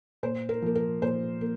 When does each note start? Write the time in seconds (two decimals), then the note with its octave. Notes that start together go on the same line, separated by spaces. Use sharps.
0.23 A#2 C5
0.49 A#4
0.62 F3 A#3
0.75 A#4
1.02 A#2 C5
1.41 A#3